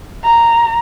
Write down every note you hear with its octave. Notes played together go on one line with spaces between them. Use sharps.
A#5